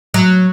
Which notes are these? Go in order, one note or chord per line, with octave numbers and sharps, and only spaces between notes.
F#3